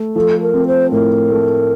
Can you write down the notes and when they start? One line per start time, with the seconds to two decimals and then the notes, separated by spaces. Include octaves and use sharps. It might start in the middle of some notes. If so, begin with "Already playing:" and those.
Already playing: A3
0.16 F3 A4
0.41 A#4
0.54 C4
0.67 C5
0.92 A2 A#4
1.30 A3